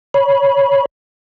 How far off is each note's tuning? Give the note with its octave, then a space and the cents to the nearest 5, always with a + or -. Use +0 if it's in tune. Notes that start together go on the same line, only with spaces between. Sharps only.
C#5 +0 B5 -20